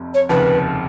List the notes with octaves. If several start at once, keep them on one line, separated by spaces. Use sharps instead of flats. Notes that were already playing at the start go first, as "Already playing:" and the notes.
Already playing: F1 F2 C3
C#5
F1 D#2 C#3 F3 B4